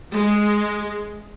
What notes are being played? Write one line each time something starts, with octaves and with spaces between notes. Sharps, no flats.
G#3